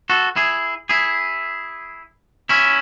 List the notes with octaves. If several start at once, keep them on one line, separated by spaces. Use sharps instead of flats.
F#4 A4
E4 G#4
E4 G#4
C#4 E4